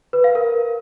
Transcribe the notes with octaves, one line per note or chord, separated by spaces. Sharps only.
B4
F5
A#4